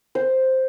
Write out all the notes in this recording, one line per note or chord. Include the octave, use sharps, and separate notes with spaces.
C5